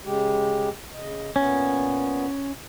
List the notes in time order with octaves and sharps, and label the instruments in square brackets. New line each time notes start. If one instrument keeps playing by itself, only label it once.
[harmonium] C#3 G#3 G4
C#3 D#5
[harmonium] A#2 B3 [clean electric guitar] C#4